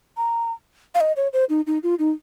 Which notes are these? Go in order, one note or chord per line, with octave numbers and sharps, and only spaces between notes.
A#5
F5
D#5
C#5
C5
D#4
D#4
F4
D#4